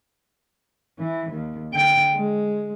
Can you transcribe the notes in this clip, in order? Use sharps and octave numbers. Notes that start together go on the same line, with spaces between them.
E3
D#2
D3 G5
G#3